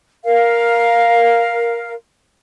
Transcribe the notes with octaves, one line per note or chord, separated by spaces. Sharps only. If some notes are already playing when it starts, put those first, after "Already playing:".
A#4 F5